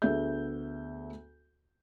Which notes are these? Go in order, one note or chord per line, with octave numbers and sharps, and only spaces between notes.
D2 B3 G#4 E5 G6